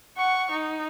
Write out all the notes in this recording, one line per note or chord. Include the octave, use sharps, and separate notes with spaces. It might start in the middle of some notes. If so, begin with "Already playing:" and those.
F#5 C#6
D#4